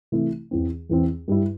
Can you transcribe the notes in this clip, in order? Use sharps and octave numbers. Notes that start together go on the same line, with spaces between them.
C3 E3 A3 E4
E2 E3 C4
E2 E3 C4
G2 G3 E4